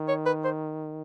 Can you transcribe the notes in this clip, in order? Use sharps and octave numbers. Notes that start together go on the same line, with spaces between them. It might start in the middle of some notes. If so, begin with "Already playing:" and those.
Already playing: D#3
C#5
B4
C5